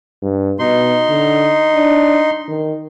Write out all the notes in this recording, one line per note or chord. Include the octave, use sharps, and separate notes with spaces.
G2
B2 D#4 C6
D3
D4
D#3